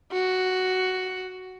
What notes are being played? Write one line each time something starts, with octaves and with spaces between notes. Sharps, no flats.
F#4